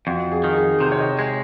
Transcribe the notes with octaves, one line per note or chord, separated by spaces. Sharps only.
F2 F#4
G#4
D#3
G#4
C3 C5
C#5
D#5
G#3 C#5